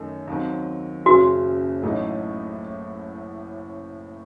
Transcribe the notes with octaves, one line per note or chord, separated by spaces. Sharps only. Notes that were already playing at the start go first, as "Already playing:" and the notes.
Already playing: F#2 D#3 A3 D#4
D#2 D#3 F#3 C4
F#1 F#2 C#3 F#4
A1 A2 F#3 A3 D#4